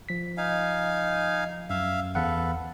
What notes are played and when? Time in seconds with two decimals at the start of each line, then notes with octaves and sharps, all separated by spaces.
0.09 F3 B6
0.38 D#4 F5 G#5
1.70 F#2 E5 F5
2.15 E2 A4 B4 F5 F#5